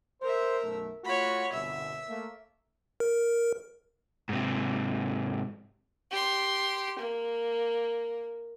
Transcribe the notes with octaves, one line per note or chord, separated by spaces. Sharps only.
A#4 C5 E5
B1 F#2 A3
A3 F4 F#4 C#5 B5
G1 C2 B2 E5
A3 A#3
A#4
G#2 C3
G4 C6
A#3